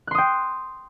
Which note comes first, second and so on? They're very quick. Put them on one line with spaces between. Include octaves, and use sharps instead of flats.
F#6 C6 D#6 G5